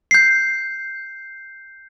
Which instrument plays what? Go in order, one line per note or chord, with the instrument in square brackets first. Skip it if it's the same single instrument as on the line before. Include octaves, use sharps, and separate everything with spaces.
[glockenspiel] G6 C7